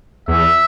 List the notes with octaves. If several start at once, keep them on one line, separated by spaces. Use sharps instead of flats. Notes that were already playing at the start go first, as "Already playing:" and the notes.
E2 E5